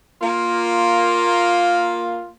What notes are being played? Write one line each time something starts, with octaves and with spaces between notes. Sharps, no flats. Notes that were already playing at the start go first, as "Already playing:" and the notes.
A#3 F4